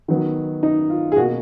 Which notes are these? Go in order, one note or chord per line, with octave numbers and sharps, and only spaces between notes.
D#3 F#3 B3
D#4
F4
G#4
B2 A#3 F#4